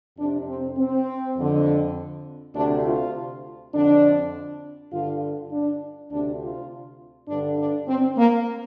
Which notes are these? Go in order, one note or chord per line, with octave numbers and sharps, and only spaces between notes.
F2 C3 D4
C4
C4
F2 D3
D2 C3 D4
F4
F2 D3 D4
G2 D3 F4
D4
D2 C3 D4
F4
G2 D3 D4
D4
C4
A#3